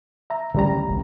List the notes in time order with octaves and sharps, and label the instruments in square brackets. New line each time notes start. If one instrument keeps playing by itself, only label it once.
[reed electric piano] E5 A#5
[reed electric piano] D2 G3 A#5 [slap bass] C#3 E3 F#3
[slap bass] E1 C#2